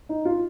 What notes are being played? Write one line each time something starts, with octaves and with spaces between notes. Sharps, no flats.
D#4
F4